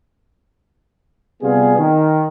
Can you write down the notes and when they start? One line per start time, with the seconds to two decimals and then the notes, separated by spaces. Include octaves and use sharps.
1.42 C3 G3 B3 F4 G#4
1.78 D#3